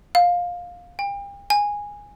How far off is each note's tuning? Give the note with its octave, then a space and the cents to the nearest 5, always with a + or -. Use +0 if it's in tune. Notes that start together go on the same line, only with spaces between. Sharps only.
F5 +15
G5 +40
G#5 -10